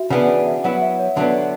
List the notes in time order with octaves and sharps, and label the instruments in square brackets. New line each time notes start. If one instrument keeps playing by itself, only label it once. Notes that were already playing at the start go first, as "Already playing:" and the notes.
Already playing: [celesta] F#4 E5
[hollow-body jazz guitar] C#3 E3 B3 D4 [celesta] F#5
[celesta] E5
[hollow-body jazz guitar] F#3 B3 E4 [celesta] F#5
[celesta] E5
C#5
[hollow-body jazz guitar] D3 F#3 B3 D4